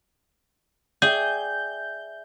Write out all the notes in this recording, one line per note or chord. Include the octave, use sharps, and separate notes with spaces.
G#4 D5 E5 G5 G6